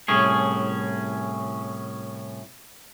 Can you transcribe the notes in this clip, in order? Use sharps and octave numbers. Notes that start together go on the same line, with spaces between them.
C2 A2 C#4 G#4